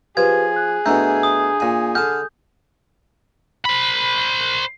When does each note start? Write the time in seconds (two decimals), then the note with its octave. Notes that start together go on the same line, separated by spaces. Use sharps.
0.17 F3 G4 G#4 B4 G#6
0.56 F#6
0.86 B2 E3 A3 D4 E5 A#5 G6
1.23 D#6
1.60 A#2 G#5
1.95 D3 A5 F6 G6
3.65 C5 B5